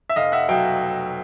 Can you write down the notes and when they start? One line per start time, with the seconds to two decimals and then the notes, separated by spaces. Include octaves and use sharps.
0.10 E5
0.16 F1 D#5 F5
0.32 E5 F#5
0.49 B2 F#3 F5 G5